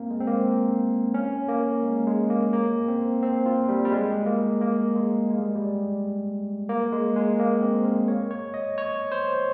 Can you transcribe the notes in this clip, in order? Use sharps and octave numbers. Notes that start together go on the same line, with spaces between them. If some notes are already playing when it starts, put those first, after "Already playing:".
Already playing: A#3 C4
G#3
C4
A#3
C#4
A#3
G#3
G#3
A#3
A#3
C4
C4
F4
G3
G3
G#3
A#3
A#3
G#3
G#3
G3
G3
A#3
G#3
G#3
A#3
C4
A#4
C#5
C#5
D#5
C#5
C5